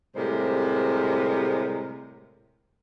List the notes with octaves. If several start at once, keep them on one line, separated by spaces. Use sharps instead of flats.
A2 C3 G3 G#3 A#4 C5